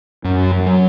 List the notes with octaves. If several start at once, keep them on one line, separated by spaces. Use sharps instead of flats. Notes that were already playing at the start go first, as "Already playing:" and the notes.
F#2
F#3